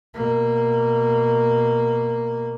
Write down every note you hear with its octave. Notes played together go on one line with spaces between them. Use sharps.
B2 A#3